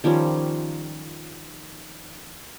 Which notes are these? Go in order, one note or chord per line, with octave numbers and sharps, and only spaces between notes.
D#3 F3 G3 C#4